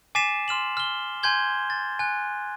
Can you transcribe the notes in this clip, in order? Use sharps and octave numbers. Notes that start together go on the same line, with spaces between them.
G#5 D6 A6 B6 C7 E7
C6 F6 E7 F#7
F6 G7
G#5 C6 G6 G#6 G7
A6
G#5 F#6